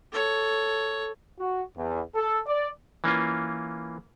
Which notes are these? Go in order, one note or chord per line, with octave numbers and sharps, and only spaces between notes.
A4 C#5
F#4
E2
A4
D5
E3 A#3 C#4 F4